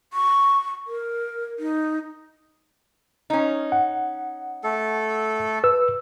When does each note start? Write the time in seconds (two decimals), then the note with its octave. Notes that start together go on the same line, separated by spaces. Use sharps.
0.13 C#6
0.87 A#4
1.59 D#4
3.30 C#4 D#4
3.72 F#5
4.64 A3 A4
5.64 B4 E6